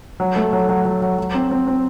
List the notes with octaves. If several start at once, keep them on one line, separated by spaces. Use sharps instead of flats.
F#3
A3
F#3
F#3
F#3
F#3
F#3
C4
C4
C4